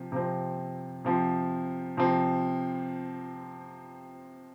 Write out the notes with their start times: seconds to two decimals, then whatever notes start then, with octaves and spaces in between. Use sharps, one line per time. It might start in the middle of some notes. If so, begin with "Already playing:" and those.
Already playing: C3 F3 C4
0.12 C3 F3 C4
1.05 C3 F3 C4
1.97 C3 F3 C4